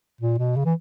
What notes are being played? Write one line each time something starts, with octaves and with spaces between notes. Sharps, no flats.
A#2
B2
C#3
E3